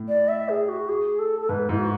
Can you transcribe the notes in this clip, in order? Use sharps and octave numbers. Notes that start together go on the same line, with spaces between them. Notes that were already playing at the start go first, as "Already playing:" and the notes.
Already playing: A2
D5
E5
G#4
F#4
G#4
A4
A4
G#2 B4
G#2 E4
F#4